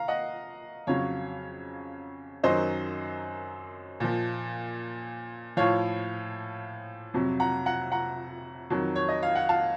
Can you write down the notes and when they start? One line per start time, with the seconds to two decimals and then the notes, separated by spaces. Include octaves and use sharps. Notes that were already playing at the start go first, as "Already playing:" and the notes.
Already playing: F5 A#5
0.08 D#5 F#5
0.87 F2 C#3 F#3 C#5 F5
2.43 F#2 D#3 F#3 C5 D#5
4.00 A#2 F3
5.57 A2 F3 C#5 F5
7.14 F2 C3 F#3
7.40 F#5 A#5
7.66 F#5 A#5
7.92 F#5 A#5
8.70 F2 D#3 F#3
8.96 C#5
9.09 D#5
9.23 F5
9.35 F#5
9.49 F5 A5